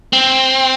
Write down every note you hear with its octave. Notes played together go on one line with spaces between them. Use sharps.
C4